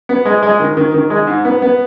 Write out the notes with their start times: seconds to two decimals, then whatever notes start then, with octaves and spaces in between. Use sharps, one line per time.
0.09 B3
0.25 G#3
0.43 G#3
0.60 D#3
0.77 D#3
0.94 D#3
1.10 G#3
1.27 G#2
1.45 B3
1.62 B3